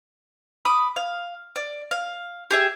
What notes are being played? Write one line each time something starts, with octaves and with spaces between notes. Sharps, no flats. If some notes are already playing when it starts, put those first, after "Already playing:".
B5 D6 D#6
F5
D5
F5
G4 G#4 E5